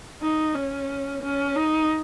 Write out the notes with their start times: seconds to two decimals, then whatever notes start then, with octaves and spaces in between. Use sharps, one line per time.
0.22 D#4
0.55 C#4
1.23 C#4
1.56 D#4